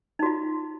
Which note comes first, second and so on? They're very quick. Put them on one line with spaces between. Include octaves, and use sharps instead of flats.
D#4 F#4 F4